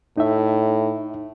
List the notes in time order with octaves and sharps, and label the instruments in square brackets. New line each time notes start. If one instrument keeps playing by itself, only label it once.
[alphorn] A2 [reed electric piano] D#4 E5